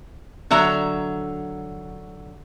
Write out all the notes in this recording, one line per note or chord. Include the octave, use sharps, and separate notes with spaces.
D3 F#3 E5 A#5